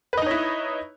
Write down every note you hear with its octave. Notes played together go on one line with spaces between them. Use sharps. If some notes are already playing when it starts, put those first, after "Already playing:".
D#4 E4 B4 C#5 D#5